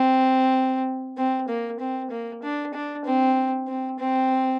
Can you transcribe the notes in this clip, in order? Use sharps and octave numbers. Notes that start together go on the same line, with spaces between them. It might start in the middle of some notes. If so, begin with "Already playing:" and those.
Already playing: C4
C4
A#3
C4
A#3
D4
D4
C4
C4
C4